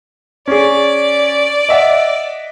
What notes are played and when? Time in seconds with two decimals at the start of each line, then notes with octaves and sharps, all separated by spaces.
0.48 C#4 G#4 D5
1.69 D#5 E5 F#5